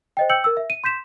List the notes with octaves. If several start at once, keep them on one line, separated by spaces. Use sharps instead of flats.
C5 D#5 G5
G5 E6 G6 C#7 F#7
A#4 E6
E5
D#7
C6 G6 B6 E7